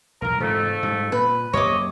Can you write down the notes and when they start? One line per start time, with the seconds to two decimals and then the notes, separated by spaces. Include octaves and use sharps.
0.22 B1 E2 A#4
0.40 F2 G#2 C3 E3 A3
0.83 G#2 G3
1.12 A#2 B4 B5
1.54 F#2 C3 A#3 C#5 D#5 D6